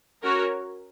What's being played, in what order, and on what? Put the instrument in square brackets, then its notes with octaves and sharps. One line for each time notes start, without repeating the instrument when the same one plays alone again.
[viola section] C#4 F#4 A#4 C#5